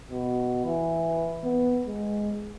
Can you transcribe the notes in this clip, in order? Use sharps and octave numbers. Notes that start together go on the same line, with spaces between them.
B2
E3
B3
G#3